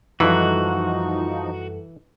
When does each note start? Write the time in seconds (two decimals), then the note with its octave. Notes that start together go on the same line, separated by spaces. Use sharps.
0.20 F#2 E3 F3 G3 D#4 F#4 A4